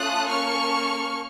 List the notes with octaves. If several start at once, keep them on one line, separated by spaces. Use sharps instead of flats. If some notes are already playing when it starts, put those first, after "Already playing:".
Already playing: A3 C#4 F4 A4 D#6 F#6
A#3 C#4 A4 C#6 F6